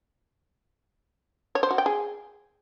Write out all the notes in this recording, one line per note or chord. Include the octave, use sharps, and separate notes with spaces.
C#5
C5
F#4
G5
G#4